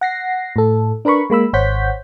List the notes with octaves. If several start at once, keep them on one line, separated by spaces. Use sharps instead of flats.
F#5 A#6 C7
A2 A4
D4 A#4 B4 B5 C#6
G#3 A#3 B5 E6
G#1 C5 C#5 F#5 G6 B6